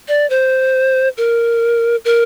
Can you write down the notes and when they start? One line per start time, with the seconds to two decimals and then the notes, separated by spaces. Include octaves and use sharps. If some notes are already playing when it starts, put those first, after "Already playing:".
0.08 D5
0.30 C5
1.17 A#4
2.05 A#4